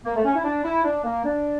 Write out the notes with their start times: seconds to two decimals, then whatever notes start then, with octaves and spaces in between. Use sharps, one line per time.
0.05 A#3
0.15 A3
0.25 C#4
0.34 E4
0.44 D4
0.65 E4
0.84 D4
1.04 A#3
1.24 D4